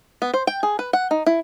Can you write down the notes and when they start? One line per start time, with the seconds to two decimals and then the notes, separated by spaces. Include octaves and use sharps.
0.22 B3
0.34 C5
0.47 G5
0.63 G#4
0.79 B4
0.93 F#5
1.11 D#4
1.27 E4